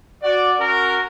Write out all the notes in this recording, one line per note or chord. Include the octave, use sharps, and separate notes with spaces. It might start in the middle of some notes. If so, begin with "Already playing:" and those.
F#4 D5
C#4 F#4 A#4